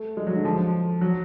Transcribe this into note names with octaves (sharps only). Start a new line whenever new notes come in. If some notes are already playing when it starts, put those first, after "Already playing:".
Already playing: A3
G#3
F#3
D3
F3
F#3